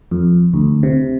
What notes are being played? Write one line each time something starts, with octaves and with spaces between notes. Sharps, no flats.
F2
D2
C3